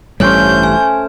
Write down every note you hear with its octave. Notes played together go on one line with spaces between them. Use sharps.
A1 G2 G3 A3 C#4 C5 C#5 G6
G#5